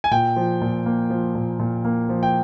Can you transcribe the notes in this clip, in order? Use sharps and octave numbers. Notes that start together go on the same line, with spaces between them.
G#5
A#2 G5
F3
A#2
A#3
F3
A#2
A#2
A#3
F3
G5